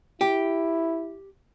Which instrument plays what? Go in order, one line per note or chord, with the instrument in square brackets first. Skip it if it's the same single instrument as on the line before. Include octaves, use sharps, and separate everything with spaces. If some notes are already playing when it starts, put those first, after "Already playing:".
[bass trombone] E4 [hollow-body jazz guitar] G4